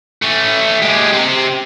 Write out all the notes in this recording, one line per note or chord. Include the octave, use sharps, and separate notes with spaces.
A3 C#4
G#3 G4
C3 C4